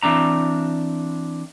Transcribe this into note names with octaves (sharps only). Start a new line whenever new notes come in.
E3 C4 D4 A#5